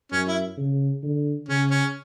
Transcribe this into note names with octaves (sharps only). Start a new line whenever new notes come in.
F#2 C#4
E4
C#3
D3
C#3 C#4
C#4